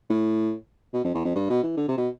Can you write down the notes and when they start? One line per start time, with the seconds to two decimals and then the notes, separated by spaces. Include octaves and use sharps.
0.10 A2
0.94 B2
1.04 F2
1.14 E2
1.25 F2
1.35 G2
1.50 B2
1.63 E3
1.77 D3
1.88 C3
1.97 B2